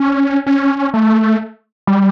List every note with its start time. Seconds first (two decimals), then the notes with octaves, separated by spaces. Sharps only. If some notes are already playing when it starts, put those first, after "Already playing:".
Already playing: C#4
0.47 C#4
0.94 A3
1.87 G3